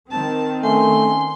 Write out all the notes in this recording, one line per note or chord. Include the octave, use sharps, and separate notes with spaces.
D#3 C4 A5
A3 C#4 G#5 C6